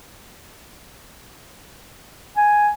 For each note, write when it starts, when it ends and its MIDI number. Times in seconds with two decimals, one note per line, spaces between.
2.37 2.70 80